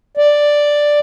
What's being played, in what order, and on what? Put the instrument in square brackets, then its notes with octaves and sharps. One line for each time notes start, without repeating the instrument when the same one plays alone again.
[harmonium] D5